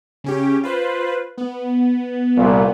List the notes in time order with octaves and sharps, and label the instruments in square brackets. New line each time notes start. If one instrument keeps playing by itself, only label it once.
[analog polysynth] C#3 C#4 G4
F4 B4 C5
B3
[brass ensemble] C2 A#2